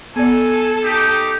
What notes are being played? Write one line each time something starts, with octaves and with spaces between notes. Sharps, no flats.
B3 A4 D5 G#5
D#4 G4